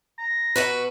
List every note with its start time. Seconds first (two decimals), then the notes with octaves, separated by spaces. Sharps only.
0.18 A#5
0.56 B2 F#4 B4